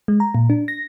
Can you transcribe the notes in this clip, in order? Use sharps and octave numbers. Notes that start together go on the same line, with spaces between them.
G#3
A#5
A#2
D4
A#6